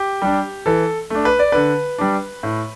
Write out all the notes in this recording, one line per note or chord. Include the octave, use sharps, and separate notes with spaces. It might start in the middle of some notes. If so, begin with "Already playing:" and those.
Already playing: G4
G3 D4
E3 A4
A3 D4
B4
D5
D3 B4
G3 D4
A2